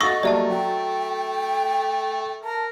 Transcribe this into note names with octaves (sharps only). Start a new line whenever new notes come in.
A3 F#4 D#5 C#6 D#6 E6 A6 A#6
F#3 G3 A#3 D5 E5 A5
F#3 G5
A#4 A5